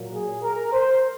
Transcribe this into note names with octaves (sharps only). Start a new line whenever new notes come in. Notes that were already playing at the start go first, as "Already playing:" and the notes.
Already playing: A#2 F#3 A#3
G#4
A#4
C5